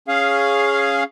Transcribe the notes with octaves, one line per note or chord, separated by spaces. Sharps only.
C#4 G#4 F5